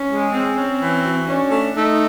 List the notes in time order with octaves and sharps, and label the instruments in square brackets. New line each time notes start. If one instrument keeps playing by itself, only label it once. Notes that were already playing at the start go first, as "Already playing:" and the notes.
Already playing: [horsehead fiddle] C#4
[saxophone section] G#3
[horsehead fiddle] C4 [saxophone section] C#4
[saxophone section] C#4
E3
F#4
[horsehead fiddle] C#4 [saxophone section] D4
[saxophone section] A3
[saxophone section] A3 [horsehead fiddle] D#4